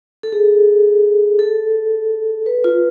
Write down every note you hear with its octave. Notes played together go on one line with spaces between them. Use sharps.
A4
G#4
A4
B4
F4